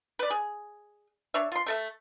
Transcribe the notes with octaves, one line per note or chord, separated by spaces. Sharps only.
B4 D5
G#4
D4 C#5 E5
F4 C6
A3 A4 E5